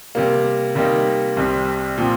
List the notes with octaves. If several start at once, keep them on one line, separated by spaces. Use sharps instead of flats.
C3 G3 A#3
C3 G3 A#3 D#4
C2 C3 G3 C4
A#2 F3 C4